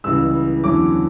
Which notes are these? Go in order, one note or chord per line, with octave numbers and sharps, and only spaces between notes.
C#2 C#3 E3 G3 E6
E2 D3 F#3 C#4 E4 D6